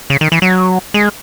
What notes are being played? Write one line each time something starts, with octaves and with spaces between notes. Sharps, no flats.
C#3
D#3
E3
F#3
G#3